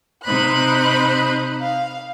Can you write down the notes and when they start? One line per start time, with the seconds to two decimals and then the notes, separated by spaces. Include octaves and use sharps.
0.24 C3 D#4 C5 B5 F#6
1.61 F5